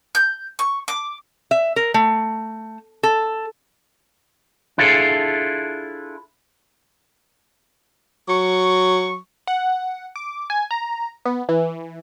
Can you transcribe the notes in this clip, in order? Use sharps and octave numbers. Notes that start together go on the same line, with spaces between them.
G6
C#6
D6
E5
A#4
A3
A4
D4 E4 F4 G#4 A4
F#3 C#6
F#5
D6
G#5
A#5
B3
E3